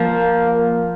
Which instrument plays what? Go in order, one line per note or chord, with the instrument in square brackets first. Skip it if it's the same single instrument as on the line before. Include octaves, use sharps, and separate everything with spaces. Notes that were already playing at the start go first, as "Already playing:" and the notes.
Already playing: [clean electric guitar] F3 [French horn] A#3